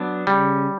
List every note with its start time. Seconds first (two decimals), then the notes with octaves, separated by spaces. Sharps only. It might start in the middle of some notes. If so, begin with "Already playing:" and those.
Already playing: F#3 B3 D4
0.27 C#3 G3